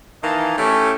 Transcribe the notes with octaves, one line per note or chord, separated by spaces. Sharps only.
D#3 E3 A#3 D#5 A5
A3 C#4 E4 G4